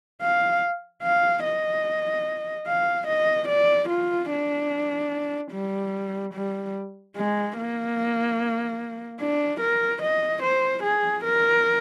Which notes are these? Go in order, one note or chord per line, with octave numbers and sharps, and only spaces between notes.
F5
F5
D#5
F5
D#5
D5
F4
D4
G3
G3
G#3
A#3
D4
A#4
D#5
C5
G#4
A#4